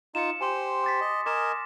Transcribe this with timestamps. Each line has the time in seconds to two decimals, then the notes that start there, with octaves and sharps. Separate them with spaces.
0.15 D#4 F4 C#7 E7
0.41 G4 C5 G#5 C6
0.84 D6 A6 B6
1.01 D#5
1.26 A#4 D#5 G#5 D6 A#6 E7